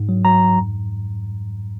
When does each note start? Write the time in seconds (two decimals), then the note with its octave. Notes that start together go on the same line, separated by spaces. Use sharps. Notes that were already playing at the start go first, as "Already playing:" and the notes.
Already playing: G#2
0.09 F#3
0.25 F#3 A#5
0.41 G#2
0.59 F2